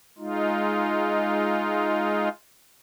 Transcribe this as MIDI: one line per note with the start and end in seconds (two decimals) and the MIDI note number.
0.18 2.29 56
0.18 2.29 63
0.18 2.29 65